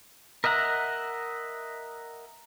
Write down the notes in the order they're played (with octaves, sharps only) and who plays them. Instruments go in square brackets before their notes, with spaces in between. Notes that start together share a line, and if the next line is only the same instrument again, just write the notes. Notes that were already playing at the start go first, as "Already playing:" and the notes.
[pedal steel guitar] A#4 D#5 E5 F#5 A#5